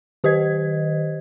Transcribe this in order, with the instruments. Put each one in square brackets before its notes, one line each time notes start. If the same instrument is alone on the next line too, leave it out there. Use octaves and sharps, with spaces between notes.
[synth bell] D#3 G4 C5 D#5 G#6